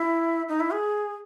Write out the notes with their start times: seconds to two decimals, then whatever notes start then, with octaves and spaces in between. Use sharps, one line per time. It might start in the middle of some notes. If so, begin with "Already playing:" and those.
Already playing: E4
0.49 D#4
0.60 E4
0.71 G#4